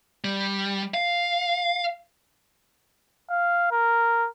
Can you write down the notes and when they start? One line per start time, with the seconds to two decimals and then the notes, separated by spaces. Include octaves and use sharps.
0.24 G3
0.94 F5
3.30 F5
3.71 A#4